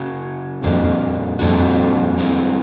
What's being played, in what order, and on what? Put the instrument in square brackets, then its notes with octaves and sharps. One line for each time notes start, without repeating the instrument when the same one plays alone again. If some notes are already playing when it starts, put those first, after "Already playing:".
Already playing: [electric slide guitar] F#2 C#3 F#3
[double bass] F2 [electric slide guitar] A#2 G3 A#3 D4 F#4
[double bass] F2 [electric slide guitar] A#2 G3 A#3 D4 F#4
[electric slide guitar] G2 E3 G#3 C4